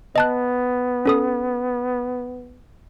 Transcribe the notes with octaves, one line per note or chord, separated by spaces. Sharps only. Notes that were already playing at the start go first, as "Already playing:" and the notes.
B3 D#5 A5 F#6
C#4 A4 D#6